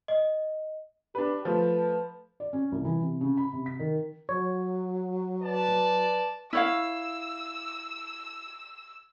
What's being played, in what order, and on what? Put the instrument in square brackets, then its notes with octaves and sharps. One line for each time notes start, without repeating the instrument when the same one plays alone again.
[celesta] D#5
[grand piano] D4 B4 [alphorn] G4
[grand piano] F3 A3 [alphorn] B4
[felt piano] D5
C#4
C2
E3
C3
C#3
B5
C3
B6
D#3
[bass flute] F#3 [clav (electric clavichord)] C#5
[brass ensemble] B4 D5 A5
[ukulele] E4 C#5 F5 [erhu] E6